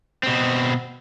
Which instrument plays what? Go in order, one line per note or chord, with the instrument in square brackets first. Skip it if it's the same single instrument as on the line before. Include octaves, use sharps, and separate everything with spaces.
[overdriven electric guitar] B2 C4